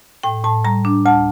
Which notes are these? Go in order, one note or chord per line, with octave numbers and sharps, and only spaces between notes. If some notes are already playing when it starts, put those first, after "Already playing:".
A2 G5
A2 A5
G3 A#5
D4
D2 A5